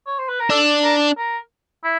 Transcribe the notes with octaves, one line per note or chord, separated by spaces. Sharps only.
C#5
C5
B4
A#4
D4 A4
A#4
A#4
E4